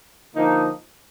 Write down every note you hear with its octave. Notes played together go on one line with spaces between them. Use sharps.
D3 F3 A#3 D#4